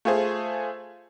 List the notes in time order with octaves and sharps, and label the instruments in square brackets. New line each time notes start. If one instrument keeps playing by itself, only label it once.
[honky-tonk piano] A3 F4 G#4 C5